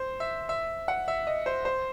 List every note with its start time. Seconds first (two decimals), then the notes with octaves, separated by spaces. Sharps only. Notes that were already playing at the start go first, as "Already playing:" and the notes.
Already playing: C5
0.20 E5
0.49 E5
0.88 F#5
1.08 E5
1.27 D#5
1.46 C5
1.65 C5